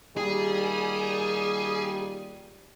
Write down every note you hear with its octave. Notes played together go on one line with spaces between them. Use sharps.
A#2 D#3 G3 G#4